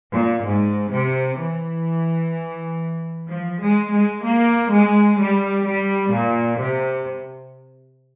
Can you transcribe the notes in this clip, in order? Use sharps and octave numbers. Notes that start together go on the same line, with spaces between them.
A#2
G#2
C3
E3
F3
G#3
G#3
A#3
G#3
G3
G3
A#2
C3